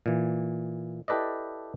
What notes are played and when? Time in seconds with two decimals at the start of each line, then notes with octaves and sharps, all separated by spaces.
0.06 A#2 E3
1.08 E4 G4 A4 B4 D5 D#5